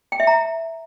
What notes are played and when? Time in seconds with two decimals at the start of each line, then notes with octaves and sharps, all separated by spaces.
0.12 G5
0.20 E5
0.27 A#5